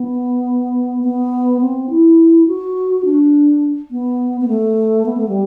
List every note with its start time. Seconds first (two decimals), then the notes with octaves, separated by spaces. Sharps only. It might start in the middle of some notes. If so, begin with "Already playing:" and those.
Already playing: B3
1.03 B3
1.61 C4
1.90 E4
2.48 F#4
3.05 D4
3.91 B3
4.41 B3
4.48 A3
5.06 B3
5.17 A3
5.29 G3